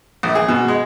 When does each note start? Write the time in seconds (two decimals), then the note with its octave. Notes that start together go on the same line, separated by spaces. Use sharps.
0.23 A#1
0.35 G#4
0.48 B2
0.68 G#3